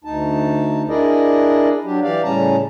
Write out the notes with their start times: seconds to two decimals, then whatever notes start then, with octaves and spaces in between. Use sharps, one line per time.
0.04 D2 D#4 A5
0.89 D4 E4 G#4 A#4 D5 D#5
1.85 F#3 D4 G4
2.03 E3 G4 D5 F5
2.23 A2 C#3 G3 C#4 A5 A#5